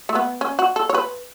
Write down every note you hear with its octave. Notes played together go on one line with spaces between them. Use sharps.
A3
B3
C#4
F#4
A4
C#5
B4